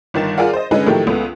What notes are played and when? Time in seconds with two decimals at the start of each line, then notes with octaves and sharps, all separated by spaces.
0.14 G1 D#3 A6 E7
0.37 F4 G#4 A#4 D5 F5 F#5
0.53 C5 D#5
0.71 D3 G#3 C#4 D#4 G#4 B4
0.86 A2 D#3 F3 F#3 A3 G4
1.07 C#2 A3 B3